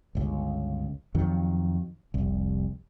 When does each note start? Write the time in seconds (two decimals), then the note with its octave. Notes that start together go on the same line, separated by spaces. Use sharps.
0.15 G1 C#2
1.15 F2 D#3 F#3
2.14 F1 C2